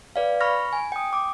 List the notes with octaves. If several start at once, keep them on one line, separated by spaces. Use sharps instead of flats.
B4 D5 F5
B5 C#6 F6 A#6
G#5
G5 D#6
D6